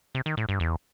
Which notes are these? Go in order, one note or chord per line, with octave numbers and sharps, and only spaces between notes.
C3
D#3
A2
G2
E2